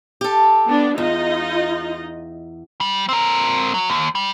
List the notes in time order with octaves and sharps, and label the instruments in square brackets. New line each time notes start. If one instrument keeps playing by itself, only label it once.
[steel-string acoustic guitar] G4 A4
[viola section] B3 D4
[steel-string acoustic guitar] E2 [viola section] D#4 F4 D#5
[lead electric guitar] G3
C4 A#4
F#3
D#2
G3